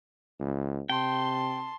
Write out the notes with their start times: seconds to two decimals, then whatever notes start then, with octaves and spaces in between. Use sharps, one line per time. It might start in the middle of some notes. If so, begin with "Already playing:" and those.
0.40 C#2
0.90 C3 G5 A5 C6